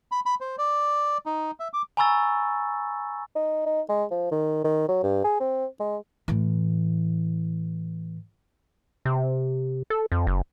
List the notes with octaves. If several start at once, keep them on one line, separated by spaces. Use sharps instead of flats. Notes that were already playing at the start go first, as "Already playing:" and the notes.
B5
B5
C5
D5
D#4
E5
D6
G#5 A#5 B5 C#6 E6 A6
D#4
D#4
G#3
F3
D#3
D#3
F#3
G2
G#4
C4
G#3
A2 E3
C3
A4
F2
F#1